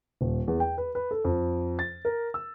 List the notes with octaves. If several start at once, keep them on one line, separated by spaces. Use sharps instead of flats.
D#1
E2
G5
B4
B4
A4
F2
A6
A#4
E6